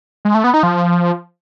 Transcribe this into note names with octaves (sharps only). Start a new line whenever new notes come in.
G#3
A3
B3
D#4
F3